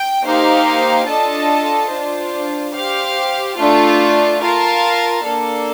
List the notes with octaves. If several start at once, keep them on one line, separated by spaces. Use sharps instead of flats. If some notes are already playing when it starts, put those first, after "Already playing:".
Already playing: G5
A#3 D#4 G4 C5 F5
D4 F4 A4 D#5 A5
D4 F4 C5
G4 C5 F5
A3 D4 F4
F4 A#4 F5 A5
A#3 D4 A4